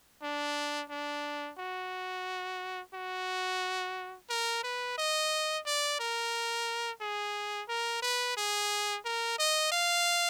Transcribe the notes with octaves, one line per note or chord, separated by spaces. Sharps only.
D4
D4
F#4
F#4
A#4
B4
D#5
D5
A#4
G#4
A#4
B4
G#4
A#4
D#5
F5